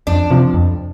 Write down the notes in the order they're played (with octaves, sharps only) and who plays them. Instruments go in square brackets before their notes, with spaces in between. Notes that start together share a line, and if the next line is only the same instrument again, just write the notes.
[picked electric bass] F2 [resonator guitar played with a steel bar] D4
[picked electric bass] C3 F3
F2